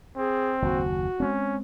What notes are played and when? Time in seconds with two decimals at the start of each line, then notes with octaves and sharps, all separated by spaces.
0.17 C4 G#4
0.62 F#1 D#2 F#4
1.20 G#3 A3 C4 C#4